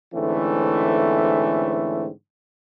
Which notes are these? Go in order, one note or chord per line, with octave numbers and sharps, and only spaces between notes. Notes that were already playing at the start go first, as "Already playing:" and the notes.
G#2 D3 E3 A3 C4 C#4